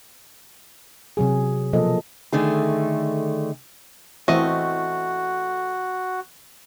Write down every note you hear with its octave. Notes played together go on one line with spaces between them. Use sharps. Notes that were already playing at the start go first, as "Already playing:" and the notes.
C3 F#3 G#4
B2 F3 F#3 A#3 A4 D#5
D3 D#3 A3 G#4
E3 A3 C4 F#4 D#5